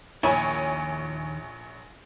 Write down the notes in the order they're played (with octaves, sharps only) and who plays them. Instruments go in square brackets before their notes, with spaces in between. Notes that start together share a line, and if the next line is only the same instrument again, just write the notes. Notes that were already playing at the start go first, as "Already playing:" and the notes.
[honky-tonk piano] A#1 C#5 G#5 [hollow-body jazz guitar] D#2 E4